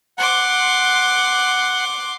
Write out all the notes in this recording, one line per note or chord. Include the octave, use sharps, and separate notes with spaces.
F#5 C6 D6